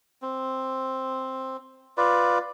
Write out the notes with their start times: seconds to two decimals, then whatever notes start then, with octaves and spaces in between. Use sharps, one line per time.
0.22 C4
1.97 F4 B4 D5